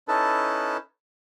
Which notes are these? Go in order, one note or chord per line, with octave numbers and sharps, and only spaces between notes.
C#4 D#4 E4 A4 B4 A5